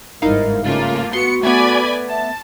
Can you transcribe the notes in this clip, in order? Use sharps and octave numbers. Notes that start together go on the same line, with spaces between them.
G1 G#2 D#4 E4 A#4 F5
C#3 A3 A#3 F4
B3 F#4 C6 C#7
A3 B3 D5 G#5 B5
E5 A5